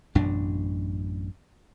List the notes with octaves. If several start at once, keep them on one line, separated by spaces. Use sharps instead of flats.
A1 F#2 B2 D4